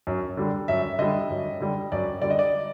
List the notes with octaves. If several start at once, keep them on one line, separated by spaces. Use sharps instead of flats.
F#2
D3 G3
F#2 E5
D3 G3 D#5
F#2
D3 G3
F#2 D5
D3 G3 D5
D#5
D5